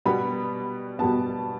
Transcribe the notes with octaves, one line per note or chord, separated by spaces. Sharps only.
B2 G3 B3 B5
B2 G3 B3 A5